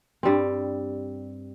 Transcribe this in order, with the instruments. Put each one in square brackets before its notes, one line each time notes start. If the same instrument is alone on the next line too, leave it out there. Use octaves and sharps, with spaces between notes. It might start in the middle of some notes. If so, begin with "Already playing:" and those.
[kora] G2 G3 C4